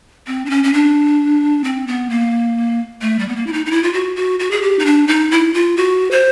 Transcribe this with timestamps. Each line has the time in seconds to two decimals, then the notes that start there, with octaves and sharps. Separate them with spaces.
0.27 C4
0.46 D4
0.50 C#4
0.64 C#4
0.73 D4
1.64 C4
1.87 B3
2.10 A#3
3.02 A3
3.19 G3
3.28 B3
3.36 A#3
3.47 E4
3.53 D#4
3.66 D#4
3.71 E4
3.83 F4
3.93 F#4
4.16 F#4
4.39 F#4
4.51 G#4
4.62 G4
4.79 D#4
4.85 D4
5.08 D#4
5.31 E4
5.54 F4
5.77 F#4
6.11 C5